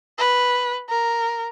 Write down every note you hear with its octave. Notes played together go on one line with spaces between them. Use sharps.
B4
A#4